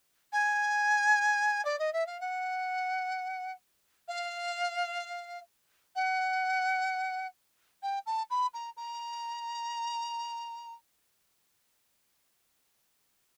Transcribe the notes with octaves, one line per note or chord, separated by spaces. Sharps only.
G#5
D5
D#5
E5
F5
F#5
F5
F#5
G5
A5
B5
A#5
A#5